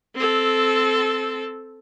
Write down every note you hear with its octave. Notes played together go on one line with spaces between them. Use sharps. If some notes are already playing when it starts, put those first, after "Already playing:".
C4 A4